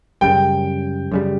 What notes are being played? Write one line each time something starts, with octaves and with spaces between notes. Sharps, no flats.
F#2 C#3 G3 G5
F#2 C#3 G3